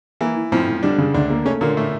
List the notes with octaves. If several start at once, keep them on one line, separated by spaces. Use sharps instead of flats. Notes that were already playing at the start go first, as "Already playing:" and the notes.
E3 A#3
E3
F2 A2 F3
A2
D3 G3 D4
C#3
D2 D3 D4
A#3
C#3 A3 C#4
A#2 D3 A#3
A2 A3